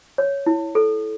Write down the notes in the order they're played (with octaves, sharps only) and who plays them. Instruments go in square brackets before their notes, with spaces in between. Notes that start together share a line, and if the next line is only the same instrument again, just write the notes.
[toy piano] C#5
E4
A4